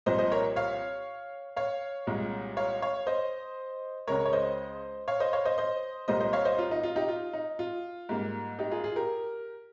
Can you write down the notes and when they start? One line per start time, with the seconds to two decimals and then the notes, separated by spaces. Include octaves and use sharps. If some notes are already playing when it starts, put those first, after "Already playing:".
0.06 C2 A#2 F3 C5 D#5
0.18 C5 D#5
0.32 A#4 C#5
0.56 C#5 F5
1.56 C#5 F5
2.07 C2 A#2 G#3
2.57 C#5 F5
2.82 C#5 F5
3.07 C5 D#5
4.07 C#2 C#3 G#3 A#4 C#5
4.26 C#5
4.33 C5 D#5
5.08 C#5 F5
5.20 C5 D#5
5.33 C#5 F5
5.45 C5 D#5
5.58 C5 D#5
6.08 C2 A#2 G3 A#3 C5 D#5
6.20 C5 D#5
6.33 C#5 F5
6.45 C5 D#5
6.58 F4
6.71 D#4
6.83 F4
6.96 D#4 G4
7.08 F4
7.33 D#4
7.59 F4
8.09 G#2 G3 A#3
8.59 D#4 G4
8.71 F4 G#4
8.84 F4 G#4
8.96 G4 A#4